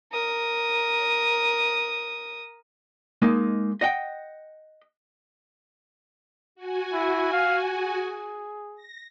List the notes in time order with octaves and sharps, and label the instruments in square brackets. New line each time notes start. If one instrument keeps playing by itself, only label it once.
[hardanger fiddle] A#4 D#6
[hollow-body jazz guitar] G#3 A#3 D#4
D#5 F#5 G5
[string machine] F#4 G#5
[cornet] E4
F5
G#4
[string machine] A#6